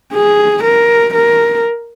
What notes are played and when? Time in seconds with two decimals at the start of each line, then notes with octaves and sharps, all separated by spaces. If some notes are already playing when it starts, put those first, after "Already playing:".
0.13 G#4
0.64 A#4
1.14 A#4